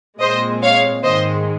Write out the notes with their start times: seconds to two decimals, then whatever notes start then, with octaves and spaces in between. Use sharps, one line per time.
0.20 A#2 G#3 C4 C5 D#5
0.62 C#5 F5
1.04 G#2 D#3 G#3 C5 D#5